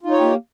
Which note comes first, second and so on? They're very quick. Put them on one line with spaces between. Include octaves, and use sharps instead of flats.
F4 D#4 C#5 G4 A#3